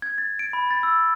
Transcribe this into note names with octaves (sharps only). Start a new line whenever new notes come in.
G#6
A6
D7
B5
A6
E6